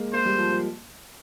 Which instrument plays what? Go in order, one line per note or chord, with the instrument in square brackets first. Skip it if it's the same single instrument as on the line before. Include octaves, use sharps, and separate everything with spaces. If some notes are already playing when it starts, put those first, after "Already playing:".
Already playing: [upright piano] G#3 A#3
[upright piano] A#3 [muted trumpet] C5
[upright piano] G3
F3
F3